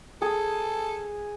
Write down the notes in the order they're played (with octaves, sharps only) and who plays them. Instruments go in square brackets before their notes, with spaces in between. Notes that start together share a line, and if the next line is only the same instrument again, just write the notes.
[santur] G#4 [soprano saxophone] A4